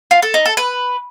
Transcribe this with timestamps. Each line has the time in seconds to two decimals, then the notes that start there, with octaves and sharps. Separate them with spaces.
0.11 F4
0.22 A4
0.34 D#4
0.46 A4
0.57 B4